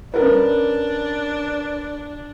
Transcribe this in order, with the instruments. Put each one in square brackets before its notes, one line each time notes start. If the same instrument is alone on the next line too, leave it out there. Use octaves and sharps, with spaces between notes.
[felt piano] C#4 A#4 B4 [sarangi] D4